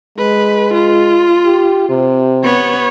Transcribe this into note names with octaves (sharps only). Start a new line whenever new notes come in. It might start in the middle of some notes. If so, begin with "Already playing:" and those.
G#3 B4
F4
G4
C3
B3 C#5